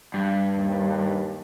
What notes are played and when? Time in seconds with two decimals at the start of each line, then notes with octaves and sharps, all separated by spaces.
0.14 G2
0.57 D#2